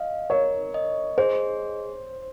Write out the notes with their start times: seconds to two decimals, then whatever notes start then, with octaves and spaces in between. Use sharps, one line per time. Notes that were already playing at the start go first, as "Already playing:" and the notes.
Already playing: D#5 F5
0.30 A#4 C#5
0.74 D#5
1.18 G#4 C5